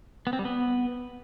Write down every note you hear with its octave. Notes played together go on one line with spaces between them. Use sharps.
B3
C4
G3
B3